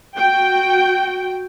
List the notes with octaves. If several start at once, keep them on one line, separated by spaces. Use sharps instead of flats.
F#4 G5